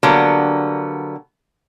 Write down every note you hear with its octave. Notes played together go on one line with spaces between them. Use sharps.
D3 F#3 G3 A#3 B3